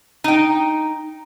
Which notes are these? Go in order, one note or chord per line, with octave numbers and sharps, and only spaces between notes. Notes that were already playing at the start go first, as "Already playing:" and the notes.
D#4 G5